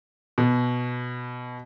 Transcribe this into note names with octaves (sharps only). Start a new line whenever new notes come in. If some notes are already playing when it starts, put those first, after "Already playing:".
B2